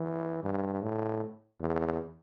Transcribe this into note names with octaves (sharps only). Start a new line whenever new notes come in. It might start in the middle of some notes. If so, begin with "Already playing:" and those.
Already playing: E3
G2
A2
E2